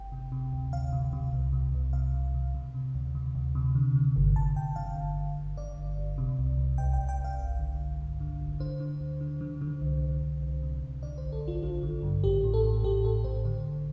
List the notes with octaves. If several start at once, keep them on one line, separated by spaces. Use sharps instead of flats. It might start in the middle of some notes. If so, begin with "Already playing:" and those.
Already playing: G1 G5
C3
C3
D2
D2 F5
C3
C3
C2
C3
C2
C3 F5
C3
C3
C3
C3
D2
C3
D2
C3
D3
D3
G1
G1 A5
G1 G5
D3 F5
G1
G1
G1
D3 D5
G1
G1
C3
C2
C2
C2 G5
G5
C2
G5
C2
F5
G1
D3
G1
G2
D3
G1
D3 C5
D3
D2
D3
D3
D3
C2
C2
C2
C2
C3
C2
D3 D5
C5
A1
A4
A1
F4
D3 F4
D3
G2
A1 G4
A2
A4
A2
A2 G4
A2 A4
A2 C5
D3 C5
A1